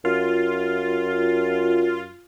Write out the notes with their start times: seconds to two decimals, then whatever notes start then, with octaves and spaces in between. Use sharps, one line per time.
0.05 F#2 F4